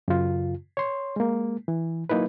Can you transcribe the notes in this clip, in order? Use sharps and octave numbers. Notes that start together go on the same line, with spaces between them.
F#2 C#3 F4
C#5 C6
G#3 A#3
E3
F#3 A#3 D#4 E4 B4